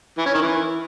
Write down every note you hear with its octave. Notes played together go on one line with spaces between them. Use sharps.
E3
C#4
D#3
E3